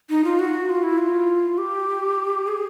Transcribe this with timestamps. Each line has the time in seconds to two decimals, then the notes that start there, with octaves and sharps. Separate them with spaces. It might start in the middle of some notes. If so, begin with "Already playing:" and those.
0.10 D#4
0.24 F4
0.39 F#4
0.69 F4
0.83 E4
0.98 F4
1.58 G4
2.47 G#4